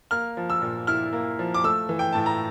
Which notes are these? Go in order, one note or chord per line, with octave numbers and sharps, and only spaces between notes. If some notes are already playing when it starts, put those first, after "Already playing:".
A#3 F6
F3
E6
A#2
E4 F6
A#3
F3
D6
A3 E6
E3
G5
A2 A5
A#5